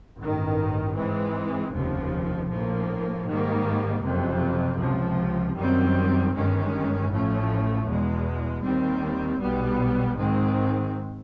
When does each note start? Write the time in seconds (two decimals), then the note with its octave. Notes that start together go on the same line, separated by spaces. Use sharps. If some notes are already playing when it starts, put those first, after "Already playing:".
0.18 A1 G2 D#3
0.95 G#2 E3 G#3 C4
1.72 F1 D#2 C#3 F3
2.49 A#1 A2 F3 A#3
3.26 G#2 D#3 G3 A#3
4.03 F#1 F2 C3
4.80 C#2 C3 F3
5.57 F#2 D#3 G3 C4
6.33 G1 G2 D#3 G#3 C#4
7.09 A1 A2 F3 A3 C#4
7.86 E2 B2 G#3
8.63 D#2 D#3 G3 C4
9.40 B1 B2 G3 B3
10.17 G#2 D#3 G#3 C4